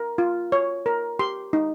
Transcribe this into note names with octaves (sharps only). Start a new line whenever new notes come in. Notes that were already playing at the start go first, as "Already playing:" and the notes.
Already playing: A#4
F4
C#5
A#4
G4 C6
D#4